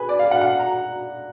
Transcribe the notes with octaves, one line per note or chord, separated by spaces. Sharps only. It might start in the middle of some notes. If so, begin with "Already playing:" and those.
Already playing: G#4 B4
D5
F5
F#5
F#5
A#5